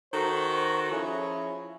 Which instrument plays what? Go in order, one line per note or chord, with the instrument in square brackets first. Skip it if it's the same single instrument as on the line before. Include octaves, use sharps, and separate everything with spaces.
[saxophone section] D#3 F#4 A4 [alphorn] C5
[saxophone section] F3 C#4 G#4 [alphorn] E4